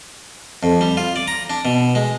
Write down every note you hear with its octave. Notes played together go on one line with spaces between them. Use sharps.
F2
G3
F4
D5
A#5
D4
B2
G#3